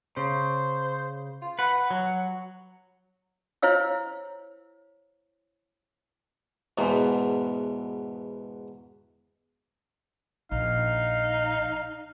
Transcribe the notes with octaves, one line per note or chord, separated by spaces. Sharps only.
C#3 C5
F4
B4 F#5
F#3
E4 C5 C#5 F5 E6
E2 G#2 B2
A#1 D#4 F5